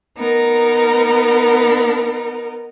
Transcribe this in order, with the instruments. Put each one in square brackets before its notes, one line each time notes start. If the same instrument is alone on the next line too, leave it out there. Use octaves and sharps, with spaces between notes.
[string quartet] B3 D#4 A#4